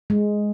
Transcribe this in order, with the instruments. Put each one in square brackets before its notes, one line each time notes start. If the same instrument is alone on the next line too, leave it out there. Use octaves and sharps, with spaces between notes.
[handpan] G#3